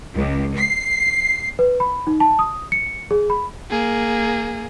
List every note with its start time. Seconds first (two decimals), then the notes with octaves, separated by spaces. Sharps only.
0.13 C#2
0.56 C7
1.59 B4
1.80 B5
2.07 D#4
2.20 A5
2.39 D#6
2.72 C#7
3.11 G#4
3.30 B5
3.71 A#3 G#4